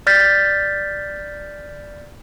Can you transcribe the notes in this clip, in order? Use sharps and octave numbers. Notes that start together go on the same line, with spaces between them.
D5 F6 G6 A6 B6